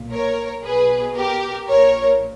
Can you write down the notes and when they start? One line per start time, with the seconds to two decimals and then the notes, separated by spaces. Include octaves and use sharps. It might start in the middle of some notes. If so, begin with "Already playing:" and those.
Already playing: B1 A#2
0.11 A#4 C#5
0.64 B1 B2 G#4 B4
1.16 G4 A#4
1.68 A#1 A#2 A#4 C#5